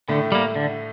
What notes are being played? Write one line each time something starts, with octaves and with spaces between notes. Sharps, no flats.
A2 D3 A3
G3 A#3
D3